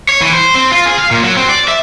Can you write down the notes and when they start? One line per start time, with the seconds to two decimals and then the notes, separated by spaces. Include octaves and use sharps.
0.09 C#5
0.21 E3
0.33 C5
0.55 C4
0.71 F4
0.86 G#4
0.98 F5
1.11 A#2
1.23 F#3
1.37 C4
1.49 D5
1.68 E5